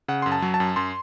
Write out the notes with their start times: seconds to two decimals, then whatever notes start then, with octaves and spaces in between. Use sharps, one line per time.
0.08 C#3 F#5
0.22 F#2 C6
0.32 A5
0.42 F#3
0.54 A5
0.60 F#2
0.76 F#2 C6